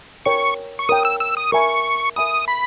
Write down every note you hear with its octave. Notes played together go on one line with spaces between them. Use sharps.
A#4 C#5 G5 C#6
C#6
A#4 C#5 G5 D#6
E6
E6
D#6
A#4 E5 G#5 B5 C#6
A#4 E5 G#5 B5 D#6
B5